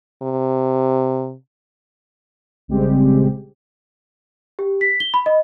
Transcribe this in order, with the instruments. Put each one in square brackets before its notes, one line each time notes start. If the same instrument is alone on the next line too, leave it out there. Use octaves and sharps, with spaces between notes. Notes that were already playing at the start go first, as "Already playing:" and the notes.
[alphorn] C3
[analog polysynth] A#1 C#3 G3 G#3 C4 G4
[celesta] G4
B6
G7
B5
D#5